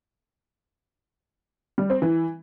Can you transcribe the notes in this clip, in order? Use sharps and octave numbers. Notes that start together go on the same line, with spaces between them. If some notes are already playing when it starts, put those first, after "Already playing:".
G3
C4
E3